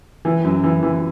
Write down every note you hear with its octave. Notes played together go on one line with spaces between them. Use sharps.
E3
F#2
E3
E3